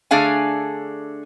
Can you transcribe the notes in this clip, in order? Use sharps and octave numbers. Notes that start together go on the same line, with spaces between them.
D3 A3 D4 G#4 F5 G#5